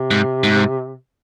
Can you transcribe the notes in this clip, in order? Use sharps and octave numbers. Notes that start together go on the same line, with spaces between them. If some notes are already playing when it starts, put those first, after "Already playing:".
Already playing: C3
G#2
G#2